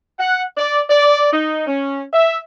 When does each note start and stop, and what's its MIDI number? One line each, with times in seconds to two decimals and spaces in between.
0.19 0.43 78
0.58 0.81 74
0.90 1.29 74
1.33 1.66 63
1.67 2.02 61
2.13 2.37 76